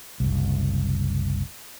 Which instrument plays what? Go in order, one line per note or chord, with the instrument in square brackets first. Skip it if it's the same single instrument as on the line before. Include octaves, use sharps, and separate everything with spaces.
[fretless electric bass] F#1 C2